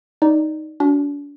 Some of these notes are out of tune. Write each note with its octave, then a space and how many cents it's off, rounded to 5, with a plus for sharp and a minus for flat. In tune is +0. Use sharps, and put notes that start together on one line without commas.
D#4 +0 D5 +0
D4 -40 F#4 +0